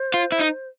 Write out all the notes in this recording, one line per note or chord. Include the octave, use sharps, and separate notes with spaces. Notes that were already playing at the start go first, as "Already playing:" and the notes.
Already playing: C5
F4
E4
D#4